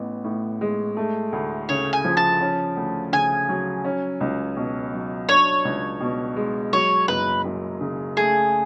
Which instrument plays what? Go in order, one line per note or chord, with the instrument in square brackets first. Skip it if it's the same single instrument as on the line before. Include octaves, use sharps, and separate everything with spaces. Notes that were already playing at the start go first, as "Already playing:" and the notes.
Already playing: [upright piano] A1 B3
A2
G#3
A3
D2
[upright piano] C#3 [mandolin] C#5
[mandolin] G#5
[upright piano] F3
[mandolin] A5
[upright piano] C#4
D2
[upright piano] C#3 [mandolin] G#5
[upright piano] F#3
C#4
C#2
B2
F#3
[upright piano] D4 [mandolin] C#5
[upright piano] C#2
B2
G#3
[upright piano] F#3 [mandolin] C#5
[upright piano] F#1 [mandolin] B4
[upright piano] F#2
C#3
[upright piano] A3 [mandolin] G#4